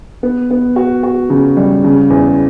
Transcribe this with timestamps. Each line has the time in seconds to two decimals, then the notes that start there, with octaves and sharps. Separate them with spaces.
0.23 B3
0.51 B3
0.76 F#4
1.03 F#4
1.30 C#3
1.57 G3
1.84 C#3
2.10 E2